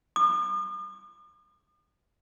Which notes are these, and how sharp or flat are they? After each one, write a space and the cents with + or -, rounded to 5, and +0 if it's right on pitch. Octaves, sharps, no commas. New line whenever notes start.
D#6 -45